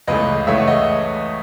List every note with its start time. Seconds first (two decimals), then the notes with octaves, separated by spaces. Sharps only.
0.07 C#2 C#3 E3 A3 B4 D#5
0.47 C#2 C#3 E3 A3 C#5 E5
0.57 D#5 F#5
0.68 D#5 F#5